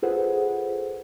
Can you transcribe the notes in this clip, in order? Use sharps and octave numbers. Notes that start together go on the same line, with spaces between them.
F4 G#4 A4 B4 C5 F#5